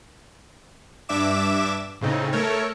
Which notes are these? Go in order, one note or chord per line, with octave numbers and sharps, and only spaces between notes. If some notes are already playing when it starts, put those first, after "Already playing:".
G2 D4 E5 D6 E7
A2 C#3 C4 D#4
A3 A4 A#4 C#5